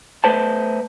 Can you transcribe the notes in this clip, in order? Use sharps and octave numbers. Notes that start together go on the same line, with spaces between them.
A3 B4 C5 A5